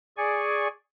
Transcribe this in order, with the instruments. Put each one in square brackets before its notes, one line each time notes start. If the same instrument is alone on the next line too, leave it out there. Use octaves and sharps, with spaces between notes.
[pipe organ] G#4 D5 G#5 C#6